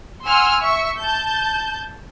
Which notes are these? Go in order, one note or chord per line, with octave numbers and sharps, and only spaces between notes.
F#5 G#5 C6 E6 F6
E5 C#6
A5 G6